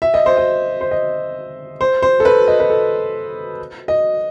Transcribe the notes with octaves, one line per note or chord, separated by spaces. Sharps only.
E5
D#5
C5
D#5
C5
D#5
C5
C5
A4
B4
D#5
B4
A4
D#5